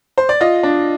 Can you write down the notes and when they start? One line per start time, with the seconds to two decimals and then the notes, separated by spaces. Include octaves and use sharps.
0.18 C5
0.29 D5
0.41 F4 D#5
0.63 D4